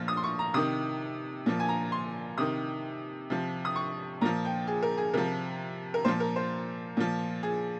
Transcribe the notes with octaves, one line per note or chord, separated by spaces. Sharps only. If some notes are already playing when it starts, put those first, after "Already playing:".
Already playing: A#2 F3 F6
D#6
C6
C#6
A#5
C3 D#3 D#6
A#2 F3
G#5
A#5
C6
C3 D#3 D#6
C3 F3
D#6
C#6
A#2 F3 A#5
G5
G#4
A#4
G#4
C3 F3 A#4
A#4
A#2 F3 C5
A#4
C5
A#2 F3
G#4